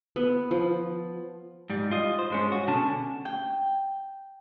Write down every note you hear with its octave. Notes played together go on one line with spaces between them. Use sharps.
B3
F3
G#2 G3
F4 D#5
C5
G2 G#3 C#4
F#4
B2 D3 C#4 D4 A5
G5